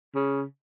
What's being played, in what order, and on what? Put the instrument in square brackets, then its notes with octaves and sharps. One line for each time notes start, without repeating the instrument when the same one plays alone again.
[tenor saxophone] C#3